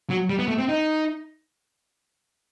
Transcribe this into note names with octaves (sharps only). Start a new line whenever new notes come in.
F#3
G3
B3
A3
C4
D#4